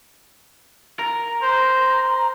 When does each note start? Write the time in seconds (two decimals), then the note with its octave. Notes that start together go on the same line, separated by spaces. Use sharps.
0.99 A#4
1.42 C5